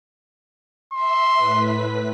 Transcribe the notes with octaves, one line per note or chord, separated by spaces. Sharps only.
E5 C6
A2 B4 B6